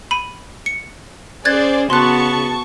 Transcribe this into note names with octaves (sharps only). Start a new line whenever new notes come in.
B5 D#7
C#7
C#4 G#4 C5 D5 F#6 G#6 A6
C#3 B3 F#4 A5 C6 C#6 F#6